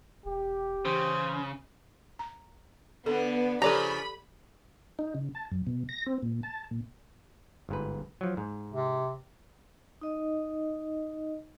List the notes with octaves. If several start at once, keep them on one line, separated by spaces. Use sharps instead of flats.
E1 G4
C#3 E3 C5
A#5
D3 B3 A4
C#3 F3 G4 A4 B4 D5 A#5 B5
D#4
C#3
A5
F#2
B2
A#6
C4
A#2
A5
A#2
G1 G#2 B4
F3 F#3
G#2
C3
D#4 D#5